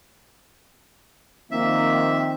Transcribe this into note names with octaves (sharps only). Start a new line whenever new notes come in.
D#3 F3 A#3 C4 E5